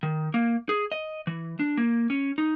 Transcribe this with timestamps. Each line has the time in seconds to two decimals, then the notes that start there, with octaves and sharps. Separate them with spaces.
0.03 D#3
0.34 A#3
0.69 G#4
0.92 D#5
1.27 E3
1.59 D4
1.77 A#3
2.10 C#4
2.38 D#4